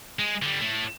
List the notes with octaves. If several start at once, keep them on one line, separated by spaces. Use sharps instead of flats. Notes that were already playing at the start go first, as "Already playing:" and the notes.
G#3
D3 G3
A2 A3